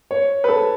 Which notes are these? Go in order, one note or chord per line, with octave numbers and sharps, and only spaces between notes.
C#5
B4
A4